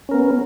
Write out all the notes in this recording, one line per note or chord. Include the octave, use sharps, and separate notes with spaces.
B3 C#4 A#4